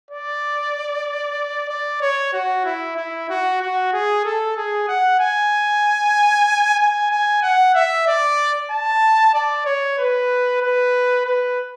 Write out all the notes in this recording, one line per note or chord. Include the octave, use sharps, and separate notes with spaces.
D5
D5
C#5
F#4
E4
E4
F#4
F#4
G#4
A4
G#4
F#5
G#5
G#5
G#5
F#5
E5
D5
A5
D5
C#5
B4
B4
B4